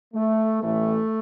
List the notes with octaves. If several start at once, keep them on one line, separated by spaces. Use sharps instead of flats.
A3
A1 A2 E3 A3